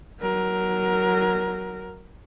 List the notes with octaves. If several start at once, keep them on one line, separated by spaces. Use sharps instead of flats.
F#3 A#4